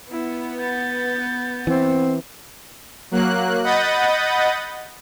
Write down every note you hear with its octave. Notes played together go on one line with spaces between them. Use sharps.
B3 E4
G6 A6
E3 C4
F#3 A#3 F#6
D#5 F#5 B5 D#6 G6 A6